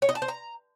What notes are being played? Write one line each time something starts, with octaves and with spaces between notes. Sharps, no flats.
C#5
D#5
A5
C5
A#5